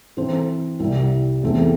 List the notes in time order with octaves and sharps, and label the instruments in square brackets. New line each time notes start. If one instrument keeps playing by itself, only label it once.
[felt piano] E3 C4 A4 C5
C2 C3 G3 E4
E2 E3 A3 C4 A4